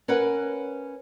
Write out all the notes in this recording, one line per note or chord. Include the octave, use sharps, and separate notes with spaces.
C#4 A#4 B4 C#5 F#5